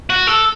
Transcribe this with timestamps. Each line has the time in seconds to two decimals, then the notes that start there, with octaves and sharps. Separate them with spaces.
0.10 F#4
0.27 A4